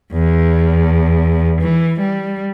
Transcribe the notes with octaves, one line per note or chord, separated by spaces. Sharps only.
E2
E3
G3